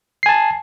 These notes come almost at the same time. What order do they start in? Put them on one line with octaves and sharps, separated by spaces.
C7 G#5 A5